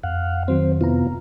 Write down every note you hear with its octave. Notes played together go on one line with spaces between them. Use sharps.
F2 F5 F#5
D#3 F#3 C4 C5
C3 B3 E4 F4 A#5